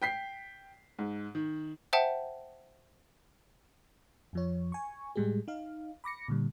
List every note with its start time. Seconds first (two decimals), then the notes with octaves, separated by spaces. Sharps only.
0.02 G5 B6 C7
0.99 G#2
1.35 D#3
1.93 C5 E5 F#5 G5 A5
4.33 F2 F3 C#5
4.72 G#5 C#6
5.16 A2 G3 G#3 G4 G#4
5.48 D#4 F5
6.04 B5 D6 A#6 C#7
6.28 A#2 D3 G3